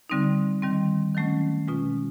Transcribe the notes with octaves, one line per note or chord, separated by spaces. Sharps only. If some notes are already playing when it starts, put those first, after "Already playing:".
D3 G3 C4 D#4
D#3 G3 C4
D#3 F#3 A3 C#4
B2 G#3 C#4 F4